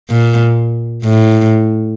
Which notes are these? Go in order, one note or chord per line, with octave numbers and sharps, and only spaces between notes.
A#2
A2